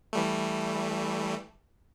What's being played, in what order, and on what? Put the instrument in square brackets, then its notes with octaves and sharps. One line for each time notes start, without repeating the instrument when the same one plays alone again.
[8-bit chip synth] E3 G3 A3